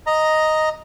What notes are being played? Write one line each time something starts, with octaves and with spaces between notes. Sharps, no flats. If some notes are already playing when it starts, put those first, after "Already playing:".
D#5 A#5